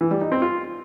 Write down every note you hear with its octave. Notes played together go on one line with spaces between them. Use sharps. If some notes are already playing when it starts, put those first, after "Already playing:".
E3
G3
D#4
C4
F4